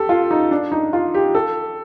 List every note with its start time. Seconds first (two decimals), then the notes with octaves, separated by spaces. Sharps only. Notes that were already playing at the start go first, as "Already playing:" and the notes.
Already playing: G4 A4
0.09 F4
0.31 D#4
0.51 D4
0.72 D#4
0.93 F4
1.14 G4
1.35 A4